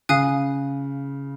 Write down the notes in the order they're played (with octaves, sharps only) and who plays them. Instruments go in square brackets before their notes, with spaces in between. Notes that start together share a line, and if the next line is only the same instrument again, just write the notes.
[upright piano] C#3 [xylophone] F5 G#5 D#6 F#6